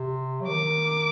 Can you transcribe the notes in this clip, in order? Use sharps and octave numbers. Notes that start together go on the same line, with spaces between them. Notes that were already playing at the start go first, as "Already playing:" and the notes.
Already playing: C3
F#3
D#3 D6